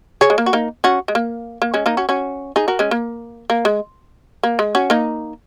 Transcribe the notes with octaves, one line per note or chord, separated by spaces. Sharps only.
G#4 C#5
G#3
A#3
F#4
A#3 D#4
C#4 F#4
G#3
A#3
A#3
G#3 C#4
A#3 D#4
C#4 F#4
C#4 F#4
D#4 G#4
F#4 A#4
G#3 C#4
A#3
A#3
G#3
A#3
G#3
C#4 F#4
A#3 D#4